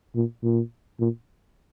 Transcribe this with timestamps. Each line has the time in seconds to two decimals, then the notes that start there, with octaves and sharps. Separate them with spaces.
0.15 A#2
0.43 A#2
1.00 A#2